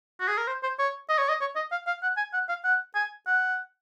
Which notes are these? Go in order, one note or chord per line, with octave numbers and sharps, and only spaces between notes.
F#4
G#4
A#4
C5
C5
C#5
D#5
C#5
D#5
C#5
D#5
F5
F5
F#5
G#5
F#5
F5
F#5
G#5
F#5